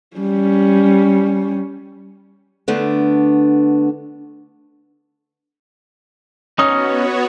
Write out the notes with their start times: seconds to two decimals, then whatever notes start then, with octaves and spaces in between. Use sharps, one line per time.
0.16 G3 C#4
2.68 D3 A3 B3 D4
6.59 B3 C#4 D#4 F#4 C#5 D#6